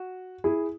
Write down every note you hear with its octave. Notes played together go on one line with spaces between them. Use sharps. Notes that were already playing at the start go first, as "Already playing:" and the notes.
Already playing: F#4
E4 G#4